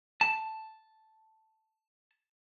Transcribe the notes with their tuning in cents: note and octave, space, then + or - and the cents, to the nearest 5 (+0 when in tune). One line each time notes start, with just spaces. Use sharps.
A5 +0